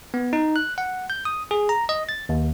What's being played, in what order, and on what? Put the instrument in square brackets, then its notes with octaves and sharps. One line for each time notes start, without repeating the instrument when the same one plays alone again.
[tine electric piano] B3
D#4
F#6
F#5
G6
D#6
G#4
A#5
D#5
A6
D#2